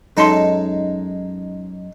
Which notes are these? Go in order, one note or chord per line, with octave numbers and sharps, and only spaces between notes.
F#2 G#3 D#4 A4 C6